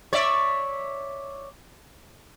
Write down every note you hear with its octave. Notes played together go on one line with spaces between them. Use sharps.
C#5 D5 E5